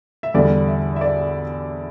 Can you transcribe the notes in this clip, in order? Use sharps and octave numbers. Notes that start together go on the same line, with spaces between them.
E5
E2 D3 G3 D5
E5
E5
D5